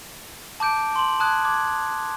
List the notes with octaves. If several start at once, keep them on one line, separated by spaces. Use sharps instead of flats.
A5 D6 G6 D7
C6 F#7
A5 D#6 F#6 G#6
D6 G#6